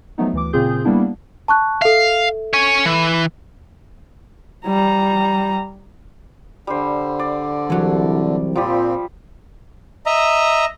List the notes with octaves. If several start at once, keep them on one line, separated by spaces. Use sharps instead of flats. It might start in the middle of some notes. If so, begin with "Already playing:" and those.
F3 F#3 A3 B3 D#4
D2 E3 D6
A#2 C#3 C4 F4 G#4 G6
G3 A#3 B3 D4 E4
A5 C#6 F#6
A4 E5 F5
C#5 G#5
E3
G3 A#5
D3 G3 C5
D5
C2 E3 F#3
A#2 F3 G3 C4 G4
D#5 E5 A#5